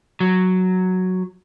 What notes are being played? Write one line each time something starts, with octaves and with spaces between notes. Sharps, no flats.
F#3